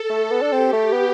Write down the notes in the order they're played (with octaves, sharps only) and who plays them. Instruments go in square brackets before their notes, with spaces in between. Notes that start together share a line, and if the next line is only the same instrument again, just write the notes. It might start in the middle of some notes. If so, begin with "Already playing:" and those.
Already playing: [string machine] A4
[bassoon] A3
B3
D4
[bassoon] C4 [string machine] G4
[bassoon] A3
B3